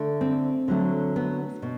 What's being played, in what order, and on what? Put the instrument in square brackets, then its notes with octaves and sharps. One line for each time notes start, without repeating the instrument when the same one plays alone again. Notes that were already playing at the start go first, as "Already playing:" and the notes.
Already playing: [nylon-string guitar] D3 A3
C4
D3 F#3 A3
B3
B2